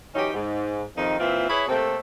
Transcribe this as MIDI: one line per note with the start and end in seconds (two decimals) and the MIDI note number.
0.15 0.32 52
0.15 0.32 54
0.15 0.32 61
0.15 0.32 63
0.15 0.32 67
0.34 0.83 44
0.96 1.19 41
0.96 1.19 48
0.96 1.19 51
0.96 1.19 63
1.19 1.45 46
1.19 1.45 52
1.19 1.45 60
1.19 1.45 65
1.19 1.45 76
1.49 1.65 64
1.49 1.65 68
1.49 1.65 71
1.49 1.65 73
1.68 1.97 48
1.68 1.97 57
1.68 1.97 58
1.68 1.97 60
1.68 1.97 69